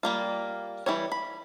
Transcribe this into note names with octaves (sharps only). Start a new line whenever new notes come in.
G3 A#3 F4
E3 G3 C#5
B5